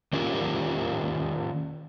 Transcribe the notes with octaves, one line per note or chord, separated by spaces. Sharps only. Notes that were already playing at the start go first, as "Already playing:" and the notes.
D#3 C#4 F4 G4 A#4